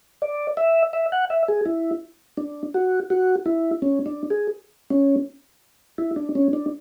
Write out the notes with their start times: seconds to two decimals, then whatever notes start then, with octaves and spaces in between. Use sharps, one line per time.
0.22 D5
0.57 E5
0.93 E5
1.12 F#5
1.30 E5
1.48 G#4
1.66 E4
2.37 D4
2.74 F#4
3.10 F#4
3.46 E4
3.82 C#4
4.06 D4
4.30 G#4
4.90 C#4
5.98 E4
6.16 D4
6.35 C#4
6.53 D4